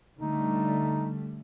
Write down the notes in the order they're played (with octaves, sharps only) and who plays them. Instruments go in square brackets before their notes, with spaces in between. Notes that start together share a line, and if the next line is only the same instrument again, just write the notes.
[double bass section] D3 G3 A3 [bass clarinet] D#4